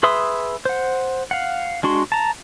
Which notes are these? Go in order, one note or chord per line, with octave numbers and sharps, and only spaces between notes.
G#4 B4 E5 C6 D#6
C5 F#5
F5 F#5
G#3 D4 F#4 C6
A5 A#5